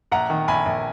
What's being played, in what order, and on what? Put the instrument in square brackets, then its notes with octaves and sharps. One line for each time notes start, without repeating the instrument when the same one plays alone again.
[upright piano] A#1 F#5 A#5
D#3
A#1 G#5 B5
A#1